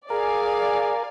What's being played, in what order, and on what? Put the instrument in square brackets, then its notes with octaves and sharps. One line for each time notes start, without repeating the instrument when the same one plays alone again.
[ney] G#4 [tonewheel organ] A#4 [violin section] D5 F5 G#5